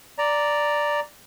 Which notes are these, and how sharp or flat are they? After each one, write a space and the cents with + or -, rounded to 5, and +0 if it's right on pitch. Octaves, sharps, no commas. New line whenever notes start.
D5 +0 A#5 +0